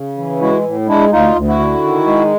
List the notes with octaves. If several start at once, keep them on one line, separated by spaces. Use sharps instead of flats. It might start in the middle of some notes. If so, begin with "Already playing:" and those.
Already playing: C#3
E3
G#3 E4 F#4
A2
G#3 D4 E4
D2 D#4 F4
D2
E4 F#4
D3
D#3
G#3